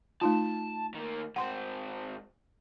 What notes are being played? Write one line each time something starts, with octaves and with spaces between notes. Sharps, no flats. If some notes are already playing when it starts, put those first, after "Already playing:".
A3 D#4 F4 A5
D#3 A#3
G#2 C4 F#5 C6